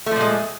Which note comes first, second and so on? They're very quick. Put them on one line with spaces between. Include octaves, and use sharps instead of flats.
A3 F3 A#2 G#3